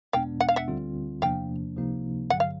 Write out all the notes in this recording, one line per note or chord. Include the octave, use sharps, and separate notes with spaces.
E2 B2 G#3 B3 D4 F5 G5
F#5
F5
E5 F#5
D2 D3 G3 C4 F4
E2 C3 F3 A#3 D4 F5 G5
C#2 C3 F3 A#3 D#4
A1 G2 D3 F#3 F#5
F5